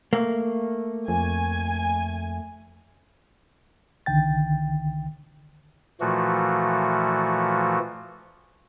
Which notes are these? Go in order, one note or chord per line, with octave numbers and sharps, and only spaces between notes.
A3 A#3
F2 G#5
C2 D3 D#3 G5 A6
A#2 E3 F3 A3 F#4